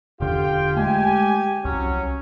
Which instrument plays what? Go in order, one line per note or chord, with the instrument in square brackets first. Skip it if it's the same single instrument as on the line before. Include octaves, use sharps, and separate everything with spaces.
[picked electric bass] E1 D3 [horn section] F4 G4 G5
[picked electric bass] G#3 A3 [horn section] G4 G#5
[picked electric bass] C2 [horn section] F#3 C#4